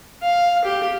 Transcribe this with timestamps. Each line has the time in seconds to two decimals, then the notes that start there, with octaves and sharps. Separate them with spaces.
0.23 F5
0.64 G4